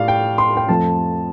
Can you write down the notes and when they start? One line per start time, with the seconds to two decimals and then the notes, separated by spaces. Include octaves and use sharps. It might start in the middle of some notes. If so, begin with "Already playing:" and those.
Already playing: A2 G3 D5 F5
0.08 G5
0.38 C6
0.57 G5
0.69 F2 F3 A3 A5